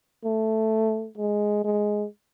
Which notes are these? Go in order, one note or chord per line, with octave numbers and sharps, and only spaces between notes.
A3
G#3
G#3